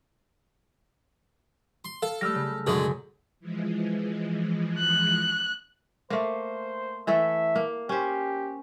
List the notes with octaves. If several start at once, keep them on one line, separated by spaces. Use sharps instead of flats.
C6
A4 F5
G3 A3 E6 F6 A#6
C#3
F#2 B2 D3 G#3 G#4
E3 F3 G#3
F#6
A3 A#3 C5
E3 A3 A4 E5
A#3
C#4 G4 C5